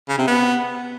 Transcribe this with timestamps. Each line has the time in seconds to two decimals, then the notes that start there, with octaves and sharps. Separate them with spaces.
0.09 C#3
0.18 C3
0.27 B3